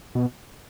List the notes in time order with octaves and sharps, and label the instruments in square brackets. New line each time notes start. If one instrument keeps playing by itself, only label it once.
[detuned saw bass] B2